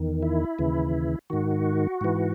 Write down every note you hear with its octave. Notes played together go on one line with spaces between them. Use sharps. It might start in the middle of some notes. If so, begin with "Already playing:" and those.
Already playing: E2 D#3
E4
D#2 C#3 E3
G#2 D#3 F#4
G#2 E3